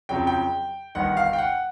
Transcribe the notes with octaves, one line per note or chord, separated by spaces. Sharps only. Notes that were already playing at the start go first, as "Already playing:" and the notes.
F2 C#3 F#3 G5
G5
G1 G2 D#3 F#5
F5
G5
F#5